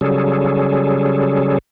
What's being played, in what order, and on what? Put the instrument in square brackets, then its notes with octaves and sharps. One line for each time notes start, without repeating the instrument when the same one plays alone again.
[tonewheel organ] C#3 F#3 G3 C#4 G#4 A4